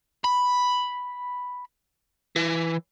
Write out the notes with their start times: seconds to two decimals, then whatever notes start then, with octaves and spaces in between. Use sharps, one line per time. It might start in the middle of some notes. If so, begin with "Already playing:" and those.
0.24 B5
2.36 E3